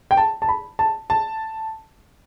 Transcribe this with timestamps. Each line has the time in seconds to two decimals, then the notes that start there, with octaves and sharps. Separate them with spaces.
0.11 G5
0.17 A5
0.42 A5
0.49 B5
0.79 A5
1.10 A5